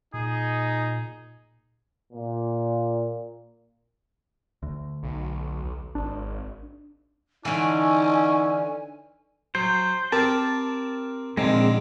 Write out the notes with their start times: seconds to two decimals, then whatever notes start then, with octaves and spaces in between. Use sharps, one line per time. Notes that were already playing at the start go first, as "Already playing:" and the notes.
0.14 A#2 D#4 G#4
2.13 A#2
4.63 D2
5.03 B1
5.95 G#1 D4
7.45 D3 E3 C#4 D#4 G#5
9.55 F#3 C5
10.12 C4 G4 A#4 A5
11.37 A#1 D3 D#3 G#3 C4